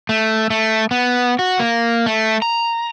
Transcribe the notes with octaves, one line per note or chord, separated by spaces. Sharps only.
A3
A3
B3
F#4
A#3
A3
A#5